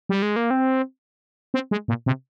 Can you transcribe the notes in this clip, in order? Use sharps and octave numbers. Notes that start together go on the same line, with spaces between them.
G3
G#3
A#3
C4
C4
G#3
A#2
C3